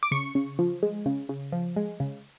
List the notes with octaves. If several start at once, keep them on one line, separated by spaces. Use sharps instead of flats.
D6
C#3 C#6
C#3
F3
G#3
C#3
C#3
F3
G#3
C#3